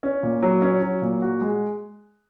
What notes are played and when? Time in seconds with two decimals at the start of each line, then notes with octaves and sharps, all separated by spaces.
0.03 C#4
0.23 A#2
0.42 F#3
0.62 C#4
0.82 F#3
1.02 A#2
1.22 F#4
1.41 G#3